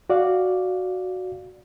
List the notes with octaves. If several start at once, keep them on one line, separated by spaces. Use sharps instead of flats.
F#4 D5 F5